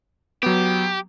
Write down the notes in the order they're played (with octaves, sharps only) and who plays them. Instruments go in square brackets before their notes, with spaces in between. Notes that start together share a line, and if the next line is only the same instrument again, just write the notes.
[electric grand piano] F#3 B3 [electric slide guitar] G4